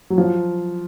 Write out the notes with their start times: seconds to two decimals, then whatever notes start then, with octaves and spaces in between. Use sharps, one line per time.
0.10 F#3
0.18 F3